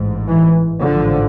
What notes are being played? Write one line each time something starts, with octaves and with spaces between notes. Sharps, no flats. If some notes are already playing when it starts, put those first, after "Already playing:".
Already playing: A1 G#2
E3
A1 G#2 D3 F3